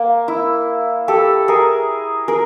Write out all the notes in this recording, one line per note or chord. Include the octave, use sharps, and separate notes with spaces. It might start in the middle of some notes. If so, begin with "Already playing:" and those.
Already playing: A#3
E4
G4 A4
G#4 A#4
G#4 A#4